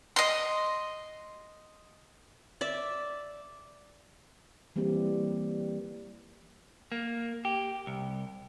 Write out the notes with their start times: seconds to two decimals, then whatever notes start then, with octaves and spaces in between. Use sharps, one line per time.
0.16 D#5 C6
2.61 D5 E5
4.76 E3 G3 A#3 C4 G4
6.92 A#3
7.45 G4
7.87 C2